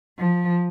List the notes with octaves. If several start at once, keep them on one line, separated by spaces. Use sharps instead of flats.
F3